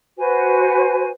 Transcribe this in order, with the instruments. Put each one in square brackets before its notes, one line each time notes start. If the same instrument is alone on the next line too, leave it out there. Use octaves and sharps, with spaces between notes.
[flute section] F#4 B4 C5 G#5